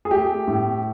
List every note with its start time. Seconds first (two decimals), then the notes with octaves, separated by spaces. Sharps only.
0.05 G#4
0.11 A3 G4
0.48 A2